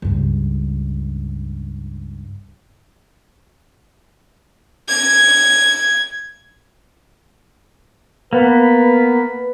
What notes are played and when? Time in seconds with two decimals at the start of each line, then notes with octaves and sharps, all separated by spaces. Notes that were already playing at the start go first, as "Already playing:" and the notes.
0.02 C#2 G2
4.89 G#6
8.33 A#3 B3 B4